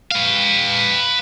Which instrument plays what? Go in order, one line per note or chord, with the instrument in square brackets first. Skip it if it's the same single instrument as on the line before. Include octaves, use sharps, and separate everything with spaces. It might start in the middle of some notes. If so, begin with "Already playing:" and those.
[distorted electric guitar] B4 F5